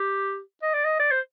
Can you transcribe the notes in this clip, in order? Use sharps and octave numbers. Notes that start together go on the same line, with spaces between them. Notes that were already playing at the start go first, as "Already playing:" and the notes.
Already playing: G4
D#5
D5
D#5
D5
C5